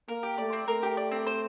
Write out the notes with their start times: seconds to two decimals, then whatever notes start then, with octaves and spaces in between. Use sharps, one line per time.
0.09 A#3 A#4
0.23 G4
0.38 A3 D5
0.53 C4
0.67 A3 A#4
0.83 G4
0.97 D5
1.12 C4
1.27 C5